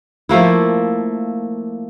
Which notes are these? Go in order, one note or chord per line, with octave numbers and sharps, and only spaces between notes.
F3 A3 A#3 E4